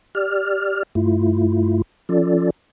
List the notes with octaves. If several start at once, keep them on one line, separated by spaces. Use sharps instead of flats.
G4 D5 F6
G2 A3 E4 F4
F3 C#4 F4 A4 D5